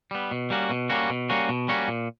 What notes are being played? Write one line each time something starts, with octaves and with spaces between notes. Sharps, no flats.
G3 B3
B2
G3 A#3 C#4 F#4
B2
G3 A#3 C#4 F#4
B2
G3 A#3 C#4 F#4
B2
G3 A#3 C#4 F#4
A#2